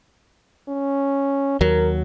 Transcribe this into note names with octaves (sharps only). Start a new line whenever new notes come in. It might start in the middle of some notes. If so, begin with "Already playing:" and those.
C#4
D#2 F#3 A#4